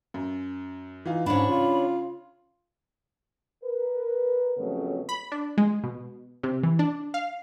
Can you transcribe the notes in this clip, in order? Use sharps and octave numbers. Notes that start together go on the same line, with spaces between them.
F#2
E3 D#4 F4
G#2 C#4 D4 F4 C#5 B5
C#3 F4
A#4 B4
F2 C#3 F3 F#3 A3 B3
B5
D4
G#3
B2
C3
E3
D4
F5